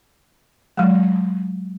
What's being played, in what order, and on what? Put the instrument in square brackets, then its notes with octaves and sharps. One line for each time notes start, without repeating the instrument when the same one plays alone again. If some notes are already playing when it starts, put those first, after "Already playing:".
[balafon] F#3 G#3